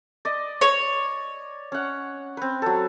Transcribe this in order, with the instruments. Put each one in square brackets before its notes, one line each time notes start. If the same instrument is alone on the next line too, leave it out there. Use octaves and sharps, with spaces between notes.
[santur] D5 D#5
[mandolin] C#5
[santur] C#4 F#5
C4 B4
F#3 A4